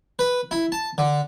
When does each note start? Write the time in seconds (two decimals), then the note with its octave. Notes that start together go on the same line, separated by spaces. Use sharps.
0.19 B4
0.51 E4
0.72 A5
0.98 D3